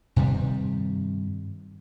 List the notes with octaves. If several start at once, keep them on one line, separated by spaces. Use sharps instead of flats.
G2 C3 D#3 G3